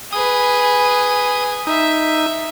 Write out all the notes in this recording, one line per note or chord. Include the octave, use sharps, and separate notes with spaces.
G#4 B4 D#6
D#4 E5